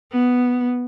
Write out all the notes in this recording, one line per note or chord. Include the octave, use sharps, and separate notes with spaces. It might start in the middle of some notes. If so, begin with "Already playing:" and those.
B3